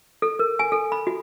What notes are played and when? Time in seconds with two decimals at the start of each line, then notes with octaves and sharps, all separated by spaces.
0.22 A4
0.39 A#4
0.59 G#5
0.72 A4
0.92 B5
1.07 F#4